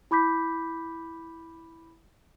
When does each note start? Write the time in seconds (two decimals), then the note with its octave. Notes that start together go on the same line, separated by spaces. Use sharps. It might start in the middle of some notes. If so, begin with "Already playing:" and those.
0.11 E4 B5 D6 G6 B6